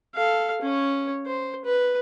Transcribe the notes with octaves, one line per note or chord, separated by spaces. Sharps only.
A4 F5
C#4 C#5
C5
B4